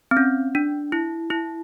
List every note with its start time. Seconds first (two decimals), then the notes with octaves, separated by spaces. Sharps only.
0.11 C4
0.17 C#4
0.55 D4
0.92 E4
1.30 E4